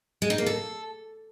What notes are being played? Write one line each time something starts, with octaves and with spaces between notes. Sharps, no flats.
G#3
D#4
A#3
A4